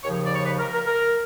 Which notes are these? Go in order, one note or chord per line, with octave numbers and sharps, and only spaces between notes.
D#2 C#3 F3 C#5
D5
C#5
B4
A#4
A#4
A#4